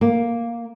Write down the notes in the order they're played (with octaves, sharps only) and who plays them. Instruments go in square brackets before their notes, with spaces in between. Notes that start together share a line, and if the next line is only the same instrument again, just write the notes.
[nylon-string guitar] A#3